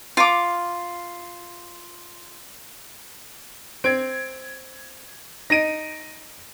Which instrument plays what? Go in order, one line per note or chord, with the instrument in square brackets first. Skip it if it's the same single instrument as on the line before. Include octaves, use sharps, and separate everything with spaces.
[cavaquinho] F4 D6
[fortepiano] C4 [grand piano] G#6 D7
[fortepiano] D#4 [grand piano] A#6 D7 D#7